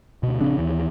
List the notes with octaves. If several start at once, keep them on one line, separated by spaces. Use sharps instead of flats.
D2 B2
A#1 C#3 C4 D4
D#2 E3